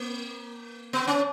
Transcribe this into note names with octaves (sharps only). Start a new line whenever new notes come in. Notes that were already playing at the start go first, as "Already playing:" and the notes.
Already playing: A#3
B3
C#4